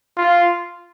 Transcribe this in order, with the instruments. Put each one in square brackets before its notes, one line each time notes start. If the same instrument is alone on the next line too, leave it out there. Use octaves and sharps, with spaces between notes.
[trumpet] F4